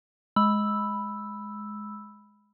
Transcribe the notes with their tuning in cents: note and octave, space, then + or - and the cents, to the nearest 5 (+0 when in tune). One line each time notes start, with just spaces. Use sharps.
G#3 +10 B5 +0 E6 +0